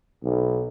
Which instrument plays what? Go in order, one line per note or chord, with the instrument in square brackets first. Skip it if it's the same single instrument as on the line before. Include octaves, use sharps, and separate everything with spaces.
[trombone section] B1